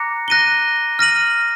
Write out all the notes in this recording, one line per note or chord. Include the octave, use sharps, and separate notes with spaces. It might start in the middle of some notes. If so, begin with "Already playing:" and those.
Already playing: A#5 D6 F#6 A#6 C#7
F#6 A#6 D#7 G7
F6 A#6 D#7 F#7